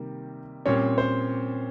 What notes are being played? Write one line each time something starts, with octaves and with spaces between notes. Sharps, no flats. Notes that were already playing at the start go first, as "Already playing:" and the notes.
Already playing: C3 D#3 G3 A#3
A#2 G3 C4 C#4 C#5
C5